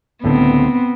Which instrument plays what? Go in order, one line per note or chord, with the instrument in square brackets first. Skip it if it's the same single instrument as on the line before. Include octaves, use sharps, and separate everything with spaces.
[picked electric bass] C#2 A2 D3 [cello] B3 C4